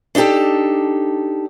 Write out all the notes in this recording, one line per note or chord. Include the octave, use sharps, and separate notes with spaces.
D4 D#4 F#4 G4 A4